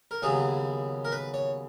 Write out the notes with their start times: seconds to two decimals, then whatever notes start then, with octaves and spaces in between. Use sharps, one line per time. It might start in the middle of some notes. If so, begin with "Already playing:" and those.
0.11 A#4
0.22 D#2 C#3 F#3 B3 G#4
1.05 A#4
1.12 B4
1.34 C#5